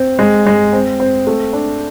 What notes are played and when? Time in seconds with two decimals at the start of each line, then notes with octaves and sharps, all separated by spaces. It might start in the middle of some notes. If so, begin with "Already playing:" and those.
Already playing: C4
0.19 G#3
0.46 G#3
0.73 C4
1.00 C4
1.27 A3
1.53 D4